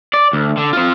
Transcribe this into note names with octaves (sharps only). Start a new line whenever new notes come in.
D5
D2
D3
C4 F4